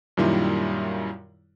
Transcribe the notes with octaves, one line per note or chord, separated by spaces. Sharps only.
F#2 A#2 D#3 G3 E4 F4